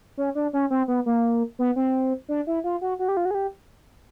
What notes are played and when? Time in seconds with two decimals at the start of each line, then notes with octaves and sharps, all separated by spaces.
0.17 C#4
0.35 D4
0.53 C#4
0.70 C4
0.88 B3
1.06 A#3
1.59 B3
1.76 C4
2.29 D4
2.47 E4
2.64 F4
2.81 F#4
2.99 F#4
3.08 G4
3.17 F4
3.25 F#4
3.31 G#4
3.35 G4